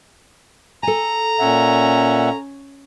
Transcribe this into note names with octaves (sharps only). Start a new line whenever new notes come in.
A4 G#5 A#5
A#2 C#4 E5 F#5